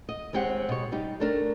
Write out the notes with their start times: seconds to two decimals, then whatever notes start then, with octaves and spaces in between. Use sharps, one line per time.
0.09 D#5
0.33 D#2 G#3 C4 G4 F#5
0.69 B2 C#5
0.92 G3 D#4 G4
1.20 A3 D4 A#4